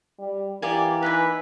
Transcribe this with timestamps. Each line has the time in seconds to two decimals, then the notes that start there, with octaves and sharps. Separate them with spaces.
0.19 G3
0.62 E3 A#3 G4 D5 G#5
1.03 D#4 E4 B4 G#5